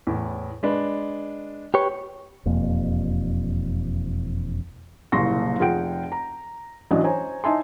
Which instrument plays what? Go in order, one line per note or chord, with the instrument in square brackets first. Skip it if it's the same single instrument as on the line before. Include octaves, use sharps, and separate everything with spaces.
[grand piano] E2 A2
G#3 D4 B4
[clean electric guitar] G4 B4 C#5
[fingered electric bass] E1 F2 A#3
[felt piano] F#1 C2 A#2 C6 C#6 A#6
F1 F4 G#4 F#5 G5 D7
A#5
A1 F#3 C#4 D4 D#5
C5 C#5 G#5 A#5
D#4 E4 E5 G#5 A5 C6